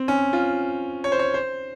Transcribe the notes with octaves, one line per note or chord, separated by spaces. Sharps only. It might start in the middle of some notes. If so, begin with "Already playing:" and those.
Already playing: C4
C#4
F4
C#5
C5
C#5
C5